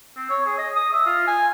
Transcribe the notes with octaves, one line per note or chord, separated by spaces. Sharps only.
C4
C#5
G#4
D#5
D#6
E5
F4
G#5